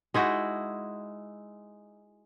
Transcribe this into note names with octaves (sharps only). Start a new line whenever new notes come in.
G#3 D#4 E4 F#4